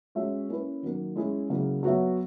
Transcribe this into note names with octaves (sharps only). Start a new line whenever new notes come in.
G#3 C#4 F#4 C#5 E5
A#3 C#4 E4 B4
D#3 F#3 A#3
G#3 C#4 E4 G#4
C#3 F#3 A#3 E4 A#4
F#3 B3 F#4 C#5 E5